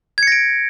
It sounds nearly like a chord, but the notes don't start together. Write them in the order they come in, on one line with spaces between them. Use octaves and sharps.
G#6 C#7 A#6 D7